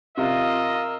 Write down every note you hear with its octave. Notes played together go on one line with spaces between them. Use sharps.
C3 F4 A#4 D#5 E6